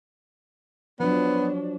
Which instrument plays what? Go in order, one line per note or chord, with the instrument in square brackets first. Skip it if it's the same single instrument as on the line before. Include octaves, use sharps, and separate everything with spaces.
[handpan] F3 F#3 [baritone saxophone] B3 [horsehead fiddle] D4